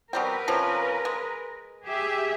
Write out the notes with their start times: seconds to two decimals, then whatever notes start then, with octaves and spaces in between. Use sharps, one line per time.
0.13 B2 G3 C4 A#4 B4
0.48 C3 F3 C#4
1.05 G#3
1.86 G4 G#4 E5